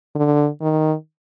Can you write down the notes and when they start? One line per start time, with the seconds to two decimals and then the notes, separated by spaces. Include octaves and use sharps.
0.15 D3
0.61 D#3